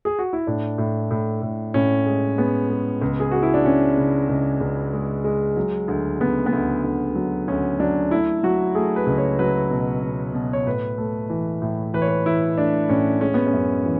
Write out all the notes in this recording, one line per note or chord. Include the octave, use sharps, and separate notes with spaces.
G#4
F#4
E4
A2 D4
A2
A2
A2
A2 C#4
G#3
G#3 B3
G#3
C#2
G#4
G#3 F#4
E4
D4
C#3 C#4
C#3
C#2
C#2
G#3
G#3
F#3
D2
C#3 B3
B3
D2
D2
F#3
D2 C#4
F#3 D4
A3 E4
F#3 F#4
A3 G#4
B4
C#2
C#5
F#3 B4
B2
B2
B2
C#5
A2 B4
A3
E3
A2
E3 B4
C#5
B4
E3 E4
A3 D4
A2 C#4
G#3 C#4
B3
C#4
F#2
E3